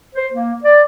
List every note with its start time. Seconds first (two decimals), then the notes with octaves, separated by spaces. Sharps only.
0.15 C5
0.33 A#3
0.64 D5